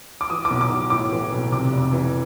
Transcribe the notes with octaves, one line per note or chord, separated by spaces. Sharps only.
D6
E3 D#6
D6
B1
D6
B1
A2 D6
E3
B1
C3 D6
F1
E3